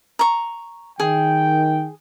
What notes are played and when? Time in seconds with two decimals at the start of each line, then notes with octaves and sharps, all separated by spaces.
0.19 A#5 C#6
1.00 D#3 G#4 G5